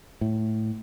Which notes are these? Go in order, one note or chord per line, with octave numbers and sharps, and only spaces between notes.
A2